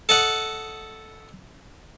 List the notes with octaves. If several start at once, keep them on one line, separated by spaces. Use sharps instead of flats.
A4 D#5 F#5